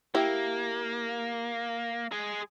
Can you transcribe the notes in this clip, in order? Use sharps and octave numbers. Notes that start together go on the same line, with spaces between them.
A#3 E4 G4
G#3 G#4